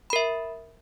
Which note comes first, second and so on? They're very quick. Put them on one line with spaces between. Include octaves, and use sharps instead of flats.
B5 A#4 E5